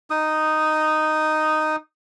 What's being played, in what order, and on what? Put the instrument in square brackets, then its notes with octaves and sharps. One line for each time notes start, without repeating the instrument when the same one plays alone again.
[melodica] D#4 D#6